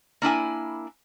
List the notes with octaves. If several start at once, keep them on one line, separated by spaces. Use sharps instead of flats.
A#3 D4 E4 G#5